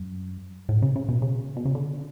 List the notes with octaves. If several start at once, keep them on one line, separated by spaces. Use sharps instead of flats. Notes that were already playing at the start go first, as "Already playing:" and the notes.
Already playing: F#2
A2
C#3
C#3
B2
C#3
B2
C#3
D3